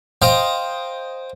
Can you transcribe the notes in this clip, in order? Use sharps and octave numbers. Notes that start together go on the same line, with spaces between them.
C5 D#5 F5 G5 A#5